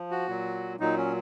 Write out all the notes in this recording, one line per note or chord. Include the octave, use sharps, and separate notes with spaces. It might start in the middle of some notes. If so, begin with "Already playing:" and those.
Already playing: F3
F#4
A#2 F#3
A#2 F#3 D#4
C#4